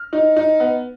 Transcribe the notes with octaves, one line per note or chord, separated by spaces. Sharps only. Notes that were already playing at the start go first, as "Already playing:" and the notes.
Already playing: F6
D#4
D#4
B3